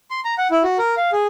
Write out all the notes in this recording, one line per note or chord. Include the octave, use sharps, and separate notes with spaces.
C6
A#5
F#5
E4
F#4
A#4
F5
G#4